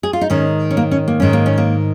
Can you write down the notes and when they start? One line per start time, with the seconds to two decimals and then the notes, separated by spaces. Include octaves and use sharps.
0.03 G#4
0.13 F4
0.21 D#4
0.30 G#2 D#3 C#4
0.71 C#4
0.77 A#3
0.91 C#4
1.08 A#3
1.20 G#2 D#3 C#4
1.33 A#3
1.46 C#4
1.58 A#3